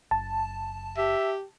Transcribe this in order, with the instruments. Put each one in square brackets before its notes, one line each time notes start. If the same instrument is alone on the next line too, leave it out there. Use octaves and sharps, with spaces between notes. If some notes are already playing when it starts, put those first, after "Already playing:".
[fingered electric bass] F#1 [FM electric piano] A5
[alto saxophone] G4 [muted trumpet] E5